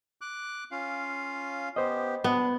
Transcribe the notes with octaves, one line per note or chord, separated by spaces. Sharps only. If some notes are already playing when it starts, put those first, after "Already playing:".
D6 F#6
C#4 F4 F5
B3 G4 C5 D#5
B3 D4